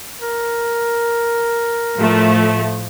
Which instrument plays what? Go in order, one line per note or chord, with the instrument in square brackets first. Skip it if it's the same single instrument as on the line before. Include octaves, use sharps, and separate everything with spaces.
[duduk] A#4
[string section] A2 F3 A3